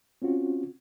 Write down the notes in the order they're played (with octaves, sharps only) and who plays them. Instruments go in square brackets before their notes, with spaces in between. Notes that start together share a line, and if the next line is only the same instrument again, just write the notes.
[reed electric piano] C4 C#4 F4 F#4